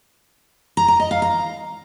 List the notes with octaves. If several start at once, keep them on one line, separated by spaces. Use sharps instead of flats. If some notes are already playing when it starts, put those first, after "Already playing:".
A#5
A#5
D#5
F5
A#5